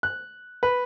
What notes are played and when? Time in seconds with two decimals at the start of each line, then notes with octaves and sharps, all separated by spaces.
0.03 F#6
0.63 B4